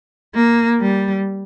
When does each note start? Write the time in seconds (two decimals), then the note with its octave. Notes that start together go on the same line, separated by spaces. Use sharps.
0.34 A#3
0.80 G3